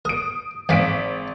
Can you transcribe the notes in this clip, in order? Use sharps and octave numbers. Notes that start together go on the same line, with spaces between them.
A#4 D#6 D7
G#1 E2 G#2 F5 B6 D7